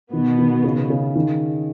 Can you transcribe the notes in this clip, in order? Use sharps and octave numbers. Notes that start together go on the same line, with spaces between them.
B2 D#3 B3
D#3
C#3
C#3
D#3